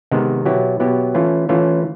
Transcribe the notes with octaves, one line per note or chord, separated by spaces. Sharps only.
C3 D#3 G#3 B3
B2 F#3 B3 E4 G4
B2 F#3 B3 E4 G4
E3 A3 C#4 F4
E3 A3 C#4 F4